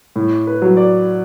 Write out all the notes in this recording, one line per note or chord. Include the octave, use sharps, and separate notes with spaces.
A2
B4
F#3
D5